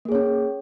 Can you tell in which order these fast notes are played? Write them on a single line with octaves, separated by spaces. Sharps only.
A#3 G#4 C#5 C#4